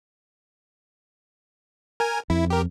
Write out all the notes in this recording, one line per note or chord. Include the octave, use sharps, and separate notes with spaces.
A#4 G#5
F2 E4
G4 A#4